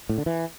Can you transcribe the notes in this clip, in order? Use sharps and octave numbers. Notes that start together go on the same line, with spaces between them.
A2
D3
E3